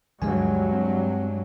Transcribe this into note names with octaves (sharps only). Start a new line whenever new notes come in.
D2 G2 D3 F3 F#3 G#3 G#5
C4